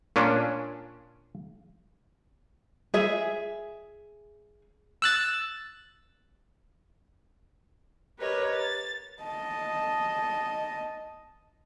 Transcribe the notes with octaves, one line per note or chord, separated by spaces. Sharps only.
A#2 C#4 D4
G#4 E5
E6 F#6 A6
G4 A#4 B4 C#5 D#5
A6
D#5 A5